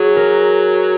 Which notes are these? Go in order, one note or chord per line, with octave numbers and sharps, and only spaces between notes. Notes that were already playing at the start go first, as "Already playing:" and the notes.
Already playing: F#3 F#4 G#4
A#4